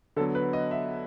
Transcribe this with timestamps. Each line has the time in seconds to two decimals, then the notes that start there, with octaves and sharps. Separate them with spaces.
0.16 D3 F#3 B3 A4
0.35 B4
0.53 D#5
0.71 E5